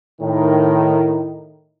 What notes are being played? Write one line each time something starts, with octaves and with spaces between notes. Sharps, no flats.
A2 D#3